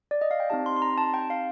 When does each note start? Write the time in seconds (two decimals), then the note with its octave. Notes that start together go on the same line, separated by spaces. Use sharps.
0.11 D5
0.21 D#5
0.31 F5
0.40 G5
0.50 C4 D#4 G4 A5
0.66 C6
0.77 C6
0.82 A#5
0.98 A5
1.14 G5
1.30 F5